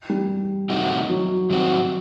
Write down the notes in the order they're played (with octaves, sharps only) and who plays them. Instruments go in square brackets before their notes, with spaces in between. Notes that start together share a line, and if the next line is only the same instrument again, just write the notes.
[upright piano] G3
[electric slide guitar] C3 D#3 A3 D#4 F#4
[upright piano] F#3
[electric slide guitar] G2 D#3 F#3 C4 F#4